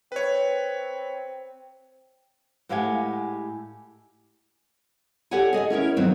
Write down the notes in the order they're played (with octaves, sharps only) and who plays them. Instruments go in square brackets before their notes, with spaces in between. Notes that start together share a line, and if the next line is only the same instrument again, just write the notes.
[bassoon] C4 [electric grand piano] B4 C#5
[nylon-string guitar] A2 G#3 G4 F5 F#5 G#5
G4 A4 C#5 D5 F#5 G#5
G#4 D#5 E5 G#5
C#4 E4 A#4 C#5
F2 D#3 F#3 B3 C4